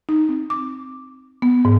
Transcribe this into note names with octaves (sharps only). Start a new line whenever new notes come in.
D#4
C4
D6
B3
G#2